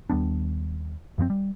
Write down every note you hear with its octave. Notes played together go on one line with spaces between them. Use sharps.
D#2 G3 B3 D4
F#2 F3 B3 C4
G3